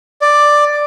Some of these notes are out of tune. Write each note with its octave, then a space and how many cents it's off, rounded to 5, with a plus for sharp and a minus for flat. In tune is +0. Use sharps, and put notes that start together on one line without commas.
D5 +5